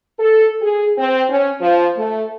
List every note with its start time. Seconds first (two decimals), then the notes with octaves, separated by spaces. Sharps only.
0.18 A4
0.61 G#4
0.97 C4
1.29 C#4
1.60 F3
1.97 A3